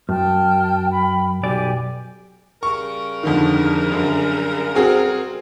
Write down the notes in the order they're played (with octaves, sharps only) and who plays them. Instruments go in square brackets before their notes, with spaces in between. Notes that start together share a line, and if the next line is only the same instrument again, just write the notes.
[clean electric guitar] F#2 [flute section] G5 A5 F6
[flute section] G5 B5
[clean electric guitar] B1 D5 [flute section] G4 G#5
[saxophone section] C#3 G3 A#4 [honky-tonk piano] C#6
[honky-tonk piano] F2 D3 D#3
F#2 D3
C4 F#4 G#4